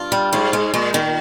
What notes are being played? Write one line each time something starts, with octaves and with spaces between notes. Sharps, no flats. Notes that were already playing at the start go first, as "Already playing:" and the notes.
Already playing: G2 F4
G3
G#2 F4
G#3
A#2 G#3
A#2 D#3